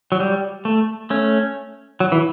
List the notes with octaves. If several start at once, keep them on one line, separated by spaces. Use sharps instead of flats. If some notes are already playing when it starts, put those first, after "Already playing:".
F#3
G3
A3
A3 C#4
F#3
E3